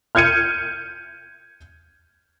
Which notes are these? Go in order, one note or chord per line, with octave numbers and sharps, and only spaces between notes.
F6 G6 G#6 C#7 D#7